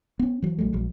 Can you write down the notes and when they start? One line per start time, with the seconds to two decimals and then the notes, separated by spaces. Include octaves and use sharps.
0.19 B3 C#4
0.42 E3 F#3
0.58 A#1 F#3 G3 A3
0.73 A#1 F#3 G#3